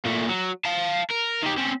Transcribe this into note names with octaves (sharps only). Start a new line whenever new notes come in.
A#2 A3
F#3
F5 A5
A#4
D#3 G4
C4 C#4